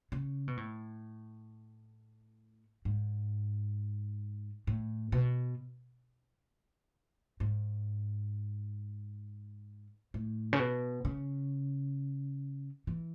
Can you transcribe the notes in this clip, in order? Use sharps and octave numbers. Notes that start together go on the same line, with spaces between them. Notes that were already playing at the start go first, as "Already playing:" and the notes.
C#3
B2
A2
G#2
A2
B2
G#2
A2
C#3
B2
C#3
E3